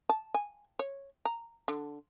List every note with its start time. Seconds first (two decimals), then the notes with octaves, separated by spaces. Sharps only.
0.09 A5
0.34 G#5
0.79 C#5
1.25 A#5
1.68 D3